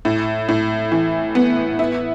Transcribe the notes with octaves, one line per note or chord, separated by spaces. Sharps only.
A2
A2
E3
B3
E4